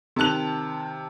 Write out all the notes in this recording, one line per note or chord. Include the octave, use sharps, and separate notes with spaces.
C3 D#3 A5 F#6 F7